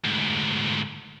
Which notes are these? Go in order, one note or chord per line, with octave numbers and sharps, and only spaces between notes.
D2 G#2